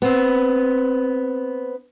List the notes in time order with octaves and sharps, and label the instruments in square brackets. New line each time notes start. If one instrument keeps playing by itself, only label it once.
[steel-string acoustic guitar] B3 C4